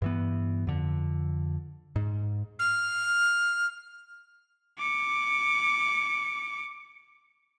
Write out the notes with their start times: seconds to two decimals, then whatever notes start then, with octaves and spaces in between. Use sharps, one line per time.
0.02 G2 E3 B3
0.67 F2 D3
1.96 G#2
2.59 F6
4.78 D6 C#7